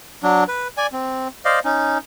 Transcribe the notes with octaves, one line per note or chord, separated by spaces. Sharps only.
F#3 D4
B4
D5 G#5
C4
C5 D5 D#5 F5
C#4 D#4